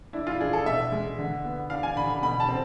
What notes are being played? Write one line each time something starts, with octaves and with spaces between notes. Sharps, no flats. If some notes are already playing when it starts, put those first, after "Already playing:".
D4 E4
F4
D4 G#4
A4
B2 E5
G#3
D3
B3
D4 F5
G#5
D3 B5
B5
B2 B5
A5
C4